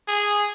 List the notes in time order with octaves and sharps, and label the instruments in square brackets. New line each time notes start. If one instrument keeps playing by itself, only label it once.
[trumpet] G#4